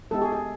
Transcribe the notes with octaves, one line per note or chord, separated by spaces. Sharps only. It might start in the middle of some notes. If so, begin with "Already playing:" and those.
G#3 B3 D#4 G4 A4
G#4
G#4